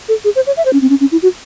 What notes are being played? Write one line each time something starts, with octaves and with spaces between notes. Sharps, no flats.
A4
G#4
C5
C#5
E5
C5
C#4
C4
C#4
C#4
E4
F#4